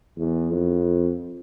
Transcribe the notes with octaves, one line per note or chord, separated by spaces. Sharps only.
E2
F2